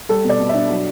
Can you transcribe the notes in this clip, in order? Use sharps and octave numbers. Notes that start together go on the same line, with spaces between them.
G3 A4
B2
D5
B2
D4 E5
F#3